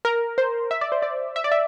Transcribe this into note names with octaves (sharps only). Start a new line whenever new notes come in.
A#4
C5
E5
D5
C5
D5
E5
D5
E5